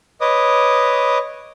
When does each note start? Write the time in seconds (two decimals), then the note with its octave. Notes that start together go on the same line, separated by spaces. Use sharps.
0.21 B4 C#5 D#5 D6 D#6